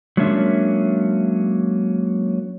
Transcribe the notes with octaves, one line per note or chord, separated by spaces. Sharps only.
F#3 G#3 A#3 C#4 D4 E5